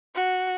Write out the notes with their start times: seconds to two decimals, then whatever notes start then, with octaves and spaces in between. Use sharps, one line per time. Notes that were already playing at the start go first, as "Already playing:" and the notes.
0.15 F#4